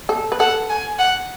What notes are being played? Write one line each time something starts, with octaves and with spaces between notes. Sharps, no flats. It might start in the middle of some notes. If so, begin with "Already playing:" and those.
A4
B4
A4 F#5
G#5
F#5